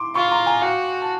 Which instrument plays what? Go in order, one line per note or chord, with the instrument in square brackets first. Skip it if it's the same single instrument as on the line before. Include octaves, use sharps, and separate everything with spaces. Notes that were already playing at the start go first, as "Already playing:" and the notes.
Already playing: [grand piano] C6 D6
[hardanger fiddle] F4 [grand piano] B5 C#6
[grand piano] A#5 C6
G#5 A#5
[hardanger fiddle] F#4 [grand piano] F5 G5
[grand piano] A5